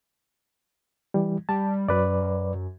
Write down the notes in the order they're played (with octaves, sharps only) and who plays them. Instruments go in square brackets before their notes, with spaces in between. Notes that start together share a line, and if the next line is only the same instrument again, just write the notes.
[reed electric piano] E3 G3
[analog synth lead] G3 [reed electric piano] A5
[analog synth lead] F#2 [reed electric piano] F#3 B4 D5
[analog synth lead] F#2